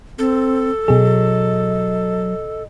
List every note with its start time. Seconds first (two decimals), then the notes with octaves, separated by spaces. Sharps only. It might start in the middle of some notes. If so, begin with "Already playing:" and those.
0.19 C4 A4
0.88 B2 F#3 G#4 D#5